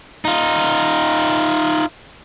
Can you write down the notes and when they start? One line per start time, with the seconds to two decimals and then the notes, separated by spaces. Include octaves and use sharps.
0.25 D#4 F4